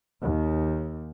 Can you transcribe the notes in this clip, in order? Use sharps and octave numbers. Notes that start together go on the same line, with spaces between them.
D#2